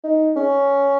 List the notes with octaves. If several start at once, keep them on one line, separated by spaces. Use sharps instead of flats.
D#4
C#4